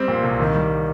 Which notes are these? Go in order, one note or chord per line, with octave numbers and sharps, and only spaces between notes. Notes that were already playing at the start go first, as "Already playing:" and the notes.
Already playing: G3 C4
A#2
C2
D#3
G3